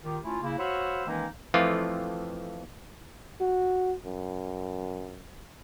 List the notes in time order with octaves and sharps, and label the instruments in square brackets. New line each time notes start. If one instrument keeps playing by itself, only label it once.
[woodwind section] D#3 F4 G4
A3 C#4 E4 F4
C#3 A#3 E4
F#4 C5 C#5 F5 B5 E6
D#3 E3 G#3 A#3 C#4 D#4
[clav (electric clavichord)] F2 E3 F3 A3 F4
[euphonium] F#4
F#2